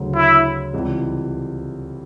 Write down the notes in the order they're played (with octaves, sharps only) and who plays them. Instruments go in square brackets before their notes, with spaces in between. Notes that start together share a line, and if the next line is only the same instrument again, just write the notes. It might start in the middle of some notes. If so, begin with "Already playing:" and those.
Already playing: [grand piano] D2 C#3 F#3
[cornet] E4
[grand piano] C#2 C3 E3 G3